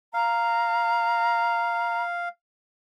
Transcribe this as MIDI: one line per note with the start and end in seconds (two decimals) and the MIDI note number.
0.14 2.29 77
0.14 2.03 82